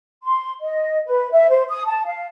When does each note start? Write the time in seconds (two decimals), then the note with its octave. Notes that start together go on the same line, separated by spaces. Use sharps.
0.23 C6
0.61 D#5
1.06 B4
1.32 E5
1.49 C5
1.68 D#6
1.87 A5
2.05 F5